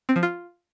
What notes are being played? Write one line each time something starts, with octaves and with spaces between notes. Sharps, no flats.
C4
F3
F4